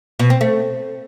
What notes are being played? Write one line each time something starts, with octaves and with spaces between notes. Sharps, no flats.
B2
C4
A3